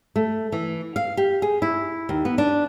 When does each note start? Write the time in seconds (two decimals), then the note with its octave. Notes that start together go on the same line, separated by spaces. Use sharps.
0.16 A3
0.52 E3
0.96 F5
1.17 G4
1.42 G#4
1.62 E4
2.09 D#2
2.25 B3
2.38 D4